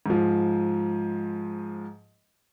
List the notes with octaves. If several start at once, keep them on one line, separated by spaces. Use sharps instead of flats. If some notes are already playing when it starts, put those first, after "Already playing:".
G#2 F3